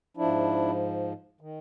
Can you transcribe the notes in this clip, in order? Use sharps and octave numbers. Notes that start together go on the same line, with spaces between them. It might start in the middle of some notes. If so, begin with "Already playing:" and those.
G#2 F3 D4 E4
D#3